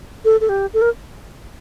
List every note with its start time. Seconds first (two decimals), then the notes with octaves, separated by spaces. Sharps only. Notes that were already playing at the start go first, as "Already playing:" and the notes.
0.25 A4
0.41 A4
0.49 G4
0.74 A4
0.82 A#4